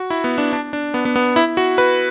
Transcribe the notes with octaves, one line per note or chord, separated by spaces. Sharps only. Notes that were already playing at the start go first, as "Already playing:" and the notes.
Already playing: F#4
E4
B3
D4
D4
D4
B3
B3
B3
E4
F#4
B4